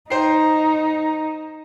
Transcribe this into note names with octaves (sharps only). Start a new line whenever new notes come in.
D#4 C5 G5 C7